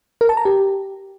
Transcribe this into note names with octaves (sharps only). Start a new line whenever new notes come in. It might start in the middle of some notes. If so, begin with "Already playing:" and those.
A#4
A5
A#5
G4